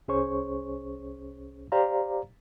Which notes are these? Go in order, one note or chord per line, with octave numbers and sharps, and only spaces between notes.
C2 C#4 G#4 C5 C#5 C#6
G4 C5 D5 F5 A#5